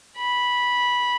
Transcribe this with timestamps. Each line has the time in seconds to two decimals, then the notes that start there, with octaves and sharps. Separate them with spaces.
0.18 B5